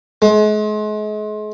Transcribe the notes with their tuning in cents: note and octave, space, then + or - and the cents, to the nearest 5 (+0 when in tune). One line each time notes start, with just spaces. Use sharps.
G#3 +35